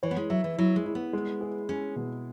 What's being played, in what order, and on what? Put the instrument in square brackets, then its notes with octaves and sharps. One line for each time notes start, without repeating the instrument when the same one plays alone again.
[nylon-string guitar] E3 [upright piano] C#5
[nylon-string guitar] B3
G#3
[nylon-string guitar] F#3 [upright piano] E5
[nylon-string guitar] E3
[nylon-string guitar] F#3 [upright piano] E4
[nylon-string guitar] G#3
[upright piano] E4
[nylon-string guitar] B3
[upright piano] G#3
G#4
[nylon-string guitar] C#4 [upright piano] G#4
[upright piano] B2